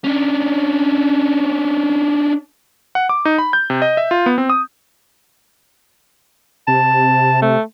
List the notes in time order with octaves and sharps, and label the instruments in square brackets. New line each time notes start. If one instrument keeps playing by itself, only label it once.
[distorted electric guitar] C#4 D4
[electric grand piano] F#5
D6
D#4
B5
G6
C3
D#5
E5
F4
B3
C4
D#6
[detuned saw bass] C3 [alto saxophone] A5
[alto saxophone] A3